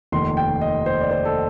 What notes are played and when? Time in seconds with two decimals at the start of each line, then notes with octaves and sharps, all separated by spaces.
0.12 F1 D#2 D#3 C6
0.37 G5
0.61 D#5
0.86 C5
1.01 D5
1.11 C5
1.25 A4